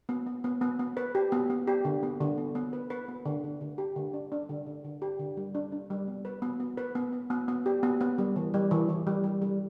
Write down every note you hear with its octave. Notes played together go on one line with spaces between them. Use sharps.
B3
B3
B3
B3
B3
B4
G4
B3
B3
G4
D3
B3
D3
B3
B3
B4
B4
B3
D3
D3
D3
G4
D3
D4
D4
D3
D3
D3
G4
D3
G3
D4
D4
G3
B3
B4
B3
B3
B4
B3
B3
B3
B3
G4
B3
B3
G3
E3
G3
E3
E3
G3
G3
G3